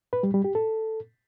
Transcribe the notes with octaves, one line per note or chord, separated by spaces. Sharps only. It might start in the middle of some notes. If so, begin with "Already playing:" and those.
B4
G3
G3
G4
A4